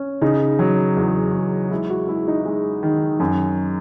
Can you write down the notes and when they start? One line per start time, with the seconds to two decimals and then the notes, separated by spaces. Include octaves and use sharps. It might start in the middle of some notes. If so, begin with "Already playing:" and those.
Already playing: C#4
0.21 C#3 D#4
0.59 F#3
0.96 E2
1.34 E2
1.71 G#3 E4
1.90 F#4
2.08 G#3 E4
2.28 D#4
2.45 G#3
2.83 D#3
3.20 F#2